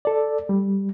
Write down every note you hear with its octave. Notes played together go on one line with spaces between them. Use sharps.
A4 D5
G3